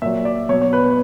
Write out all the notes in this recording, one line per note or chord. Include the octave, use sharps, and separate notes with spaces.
A#2 F#3 E5
D5
B2 F#3 C#5
C#5
B4
B4